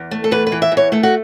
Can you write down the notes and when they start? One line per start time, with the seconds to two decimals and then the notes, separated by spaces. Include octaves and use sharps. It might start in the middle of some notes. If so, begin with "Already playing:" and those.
Already playing: E2
0.11 A3
0.24 A4
0.31 E2 B4
0.47 B4
0.52 E3
0.62 E5
0.72 E2
0.77 C#5
0.92 A3 A4
1.03 F#4